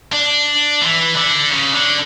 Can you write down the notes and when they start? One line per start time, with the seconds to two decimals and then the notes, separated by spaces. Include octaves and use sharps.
0.13 D4
0.81 E3
1.16 D3
1.50 C#3
1.72 D3